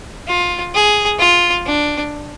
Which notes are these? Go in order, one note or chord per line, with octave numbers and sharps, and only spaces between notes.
F4
G#4
F4
D4